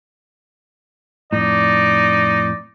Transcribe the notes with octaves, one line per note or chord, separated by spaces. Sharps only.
F2 A2 D#4 D5